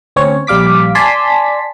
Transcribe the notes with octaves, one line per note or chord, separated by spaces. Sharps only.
D2 C4 C#4 C#5
A#1 G3 F5 D6 B6
D5 G#5 A5 C6 B6